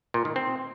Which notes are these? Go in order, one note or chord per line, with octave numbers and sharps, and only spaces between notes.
A#2
D#3
C4